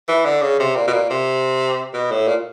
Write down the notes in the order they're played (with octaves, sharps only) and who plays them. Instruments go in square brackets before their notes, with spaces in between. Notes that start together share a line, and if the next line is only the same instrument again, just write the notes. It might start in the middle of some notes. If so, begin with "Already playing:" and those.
[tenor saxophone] E3
D3
C#3
C3
A#2
B2
A#2
C3
B2
A2
A#2